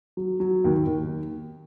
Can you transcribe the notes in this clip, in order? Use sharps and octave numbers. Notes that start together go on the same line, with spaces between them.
F#3
F#3
D#2
D#2